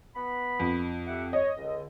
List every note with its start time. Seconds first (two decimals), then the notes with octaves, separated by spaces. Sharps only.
0.15 B3 B5
0.60 F2
1.07 G4 E5 F#5
1.33 C#5 D#5
1.57 C#2 D3